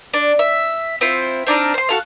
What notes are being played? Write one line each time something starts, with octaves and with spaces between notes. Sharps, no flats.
D4
E5
C4 E4 F4 C5
C4 D4 D#4 F6
C5 C6
F#4 A4 F5